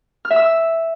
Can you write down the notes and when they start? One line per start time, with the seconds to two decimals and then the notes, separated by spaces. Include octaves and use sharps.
0.25 F6
0.30 E5
0.36 E6